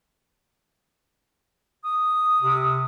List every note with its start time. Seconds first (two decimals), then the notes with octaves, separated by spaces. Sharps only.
1.83 D#6
2.42 C3